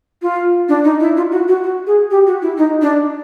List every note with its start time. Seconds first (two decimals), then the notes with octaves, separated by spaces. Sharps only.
0.22 F4
0.69 D4
0.84 D#4
1.00 E4
1.17 F4
1.31 F#4
1.48 F#4
1.63 F#4
1.87 G#4
2.11 G4
2.27 F#4
2.42 E4
2.57 D#4
2.82 D4